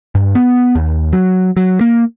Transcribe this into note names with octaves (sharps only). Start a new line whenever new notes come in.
G2
B3
D#2
F#3
F#3
A#3